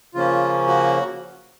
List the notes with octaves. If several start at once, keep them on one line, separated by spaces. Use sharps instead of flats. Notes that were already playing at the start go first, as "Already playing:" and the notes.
C#3 F3 A#3 C#4 F4
F#4